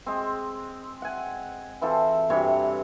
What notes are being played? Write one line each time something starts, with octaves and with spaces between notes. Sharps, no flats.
G#3 C4
F#5 G#5
E3 C4 F4 A4
G2 C3 E3 C#5